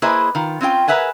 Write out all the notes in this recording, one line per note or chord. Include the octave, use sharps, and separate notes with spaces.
A#3 E4 G#4 B4 C5 D#5
D#3 F4
C4 C#4 F4 G5
G#4 A#4 B4 E5 F#5 G#5